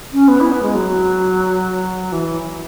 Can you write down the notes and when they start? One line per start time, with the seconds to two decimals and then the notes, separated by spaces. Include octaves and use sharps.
0.13 C#4
0.28 B3
0.40 E4
0.51 B3
0.62 G#3
0.75 F#3
2.12 E3